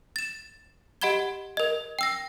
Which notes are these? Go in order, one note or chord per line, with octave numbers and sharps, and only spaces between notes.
A6 E7
G4 D#5 F#5 B5 G#6 G7
A#4 D#5
G5 E6 A#6